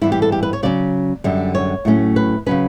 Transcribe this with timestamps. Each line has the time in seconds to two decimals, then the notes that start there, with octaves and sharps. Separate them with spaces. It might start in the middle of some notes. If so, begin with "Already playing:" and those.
0.02 G2 E3 B3 E4
0.12 G4
0.22 A4
0.32 G4
0.43 B4
0.53 C#5
0.63 C#3 F#3 C#4 D5
1.24 F#2 D3 G3
1.55 C#5
1.85 A2 F#3 A3 C#4
2.16 B4
2.46 C#3 F#3 C#4 B4